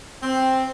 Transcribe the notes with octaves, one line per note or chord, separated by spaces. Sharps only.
C4